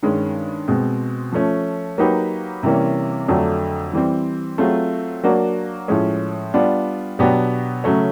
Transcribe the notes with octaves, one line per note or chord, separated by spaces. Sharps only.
G2 D#3 G#3 C#4
B2 G#3 C4
F3 A3 C#4
F#3 A#3 D#4 G4 B4
C3 E3 G3 A#3 C#4
F2 D3 F#3 A3 D4
E3 G3 C4
F#3 A3 C4 F4 G#4
F#3 A#3 D4 F#4
A2 F3 G#3 C#4
G3 B3 D4 F4
B2 F#3 B3 D4 G4
C#3 F#3 A3 C#4